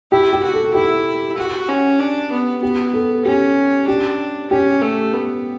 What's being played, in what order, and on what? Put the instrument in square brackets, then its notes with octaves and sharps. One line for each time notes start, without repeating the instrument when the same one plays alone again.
[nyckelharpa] E4 [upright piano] G4
[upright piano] G4
[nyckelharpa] F#4
[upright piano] A4
[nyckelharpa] E4 [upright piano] G4
[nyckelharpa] F#4
C#4
D4
B3
[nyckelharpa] B3 [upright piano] G4
[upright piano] A4
[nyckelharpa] C#4 [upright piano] G4
[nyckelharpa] D4 [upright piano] G4
[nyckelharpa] C#4 [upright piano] G4
[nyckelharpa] A3
B3